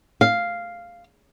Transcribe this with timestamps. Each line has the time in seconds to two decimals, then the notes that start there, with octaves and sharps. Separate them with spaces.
0.21 F5